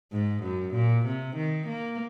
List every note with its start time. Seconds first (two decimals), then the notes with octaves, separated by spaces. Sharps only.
0.12 G#2
0.43 F#2
0.74 A#2
1.06 C3
1.36 D#3
1.68 A#3